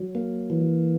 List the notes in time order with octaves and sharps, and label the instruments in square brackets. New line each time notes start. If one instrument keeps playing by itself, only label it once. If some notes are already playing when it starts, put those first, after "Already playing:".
Already playing: [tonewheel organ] F#3
A#3
E3